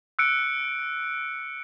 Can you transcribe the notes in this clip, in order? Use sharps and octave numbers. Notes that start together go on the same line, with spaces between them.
E6 F#6 C#7 D7